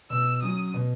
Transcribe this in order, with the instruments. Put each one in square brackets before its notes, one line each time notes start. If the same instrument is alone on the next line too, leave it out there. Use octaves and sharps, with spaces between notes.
[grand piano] B2 [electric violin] E6
[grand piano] F#3 C#4 [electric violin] D#6
[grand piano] B2